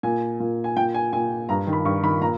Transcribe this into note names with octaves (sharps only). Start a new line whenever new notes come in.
A#2 G#5
A#2
G#5
A#2 G5
G#5
A#2 G#5
G2 A#5
D#3
B5
G2 C#6
D#3 B5
A#2 A#5